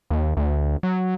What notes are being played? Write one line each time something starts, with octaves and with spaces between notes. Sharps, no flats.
D#2
D2
F#3